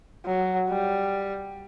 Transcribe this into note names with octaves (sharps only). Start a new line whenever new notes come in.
F#3
G3